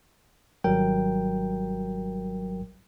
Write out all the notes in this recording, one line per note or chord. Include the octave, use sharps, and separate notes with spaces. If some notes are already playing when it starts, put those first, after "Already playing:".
G#1 F#3 G3 A#4 G5